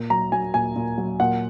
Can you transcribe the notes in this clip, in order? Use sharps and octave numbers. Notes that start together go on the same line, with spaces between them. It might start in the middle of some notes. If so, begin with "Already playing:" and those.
Already playing: A#2
F#3 A#5
F#3 G#5
A#2 G#5
A#2
F#3
A#2 F#5